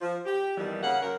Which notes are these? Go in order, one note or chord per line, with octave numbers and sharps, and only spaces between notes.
F3
G4
F2 B2 D#3 E3 G3
C#3 A#3 C#4 F#5
F#2 C#4 A#4